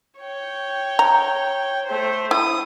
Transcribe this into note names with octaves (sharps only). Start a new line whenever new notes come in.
C#5 G5
A#5
A3 C5
E4 D#6